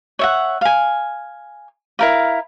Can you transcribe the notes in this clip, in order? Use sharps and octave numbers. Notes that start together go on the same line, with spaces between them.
C#5 E5 F#5
F5 G#5
E4 A#4 F5